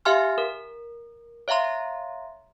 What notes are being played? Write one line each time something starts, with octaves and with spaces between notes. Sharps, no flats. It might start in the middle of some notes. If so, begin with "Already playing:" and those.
G4 E5 F5 G#5 C6 F6
A#4
C#5 E5 F5 A#5 C6